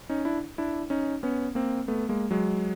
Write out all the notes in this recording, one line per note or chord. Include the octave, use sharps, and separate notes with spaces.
C#4 D#4
D4 E4
D4 E4
C#4 D#4
B3 C#4
A#3 C4
A3 B3
G#3 A#3
F#3 G#3